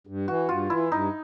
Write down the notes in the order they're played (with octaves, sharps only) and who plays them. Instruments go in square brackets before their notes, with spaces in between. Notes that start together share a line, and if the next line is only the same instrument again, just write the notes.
[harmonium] G2
[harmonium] E3 [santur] F#4
[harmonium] G2 [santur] F4
[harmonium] E3 [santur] E4
[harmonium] G2 [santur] D#4